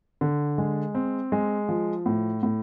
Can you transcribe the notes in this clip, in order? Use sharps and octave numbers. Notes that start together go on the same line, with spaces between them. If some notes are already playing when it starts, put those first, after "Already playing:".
D3
G#3
C4
G#3
F3
A2
A2